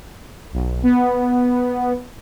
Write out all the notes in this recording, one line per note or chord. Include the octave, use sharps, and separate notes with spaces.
B1
B3